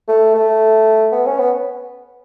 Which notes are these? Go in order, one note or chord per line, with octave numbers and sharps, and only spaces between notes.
A3
A3
B3
C#4
B3